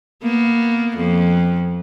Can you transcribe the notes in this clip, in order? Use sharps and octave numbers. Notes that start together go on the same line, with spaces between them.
A#3 B3
F2